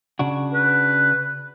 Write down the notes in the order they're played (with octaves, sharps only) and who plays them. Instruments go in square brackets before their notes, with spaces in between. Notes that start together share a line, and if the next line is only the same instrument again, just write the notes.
[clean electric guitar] C#3 D4 F#4
[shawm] B4